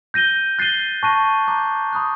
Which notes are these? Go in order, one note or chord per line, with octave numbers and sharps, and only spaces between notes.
G6 A#6 D#7 G7
F#6 A6 C7 D#7 G7
A5 C#6 F#6 A#6 D#7
A#5 D6 G6
B5 D#6 F#6